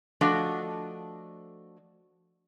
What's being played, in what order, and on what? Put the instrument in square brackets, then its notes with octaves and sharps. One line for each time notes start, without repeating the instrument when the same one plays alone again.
[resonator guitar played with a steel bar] F3 A3 D4 F#4 A4 D#5